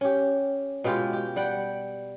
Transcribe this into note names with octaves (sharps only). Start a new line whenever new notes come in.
C#4 G4
B2 G#3 F4 G4
G4
G3 F#5 G5